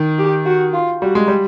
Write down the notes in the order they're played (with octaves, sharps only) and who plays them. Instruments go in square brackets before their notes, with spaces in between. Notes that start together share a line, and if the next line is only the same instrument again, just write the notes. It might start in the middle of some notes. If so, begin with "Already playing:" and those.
Already playing: [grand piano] D#3
[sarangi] G4
F#4
F4
[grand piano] G3 [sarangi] F#4
[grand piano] G#3
G3